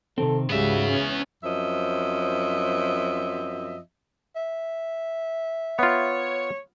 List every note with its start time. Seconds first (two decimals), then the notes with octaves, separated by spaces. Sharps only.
0.18 C3 D#3 C4 A4
0.50 C#2 G#2 C#3 G3 B3 F#4 E5
0.85 C#4
1.44 F#2 F3 C4 D#5 E5
4.36 E5
5.79 B3 F4 C#5